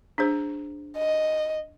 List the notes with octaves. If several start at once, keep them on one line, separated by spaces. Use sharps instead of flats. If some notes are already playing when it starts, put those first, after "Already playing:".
D4 G#4 C5
D#5